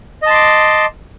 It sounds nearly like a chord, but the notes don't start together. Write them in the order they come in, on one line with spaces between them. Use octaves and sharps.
D#5 A5 C6 D6